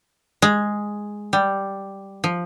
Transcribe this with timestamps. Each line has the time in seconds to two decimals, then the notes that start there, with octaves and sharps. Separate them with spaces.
0.42 G#3
1.33 G3
2.24 F3